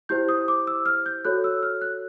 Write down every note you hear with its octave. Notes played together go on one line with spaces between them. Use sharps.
E4 G4 C5 G6
D#6
D6
E6
F6
G6
F#4 A4 C#5 F#6
E6
F6
F#6